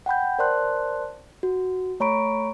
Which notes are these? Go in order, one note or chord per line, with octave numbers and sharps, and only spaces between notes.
F#5 G5 B5 G6
A#4 C5 D5 A5 C6 F#6
F#4
A3 C#5 A#5 B5 C#6 D7